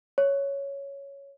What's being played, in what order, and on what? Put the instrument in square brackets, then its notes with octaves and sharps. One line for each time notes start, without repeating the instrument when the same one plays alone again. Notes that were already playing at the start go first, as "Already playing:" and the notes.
[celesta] C#5